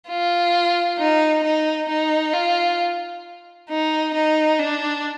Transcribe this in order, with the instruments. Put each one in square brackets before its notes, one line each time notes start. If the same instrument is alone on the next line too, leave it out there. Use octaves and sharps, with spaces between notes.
[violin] F4
D#4
D#4
D#4
F4
D#4
D#4
D4